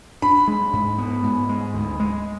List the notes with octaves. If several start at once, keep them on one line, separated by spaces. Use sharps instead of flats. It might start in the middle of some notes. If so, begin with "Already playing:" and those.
D4 B5
G#3
G#2
B3
G#2
G#3
D2
G#3